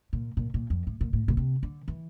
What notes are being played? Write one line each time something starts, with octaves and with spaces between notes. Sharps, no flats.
A#2
A#2
A#2
F2
A2
A#2
A2
A#2
C3
D3
E3